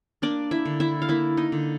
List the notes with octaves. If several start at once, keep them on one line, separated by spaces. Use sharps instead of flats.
A#3 D4 D5
E4 E5
D3
E4 E5
F5
A#3 E4 E5
D#4 D#5
D3